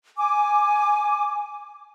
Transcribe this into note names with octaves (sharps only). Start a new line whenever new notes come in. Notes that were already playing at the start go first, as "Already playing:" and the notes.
G#5 D6